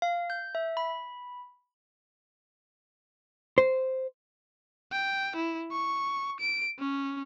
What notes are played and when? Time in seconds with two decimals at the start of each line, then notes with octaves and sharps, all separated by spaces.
0.02 F5
0.30 G6
0.55 E5
0.77 B5
3.58 C5
4.92 G5
5.36 E4
5.72 C#6
6.40 D7
6.79 C#4